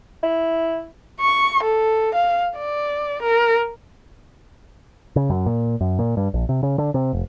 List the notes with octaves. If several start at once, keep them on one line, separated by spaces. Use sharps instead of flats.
E4
C#6
A4
F5
D5
A#4
C#3
F#2
A#2
F#2
A#2
G2
A#1
C3
C#3
D3
C3
F1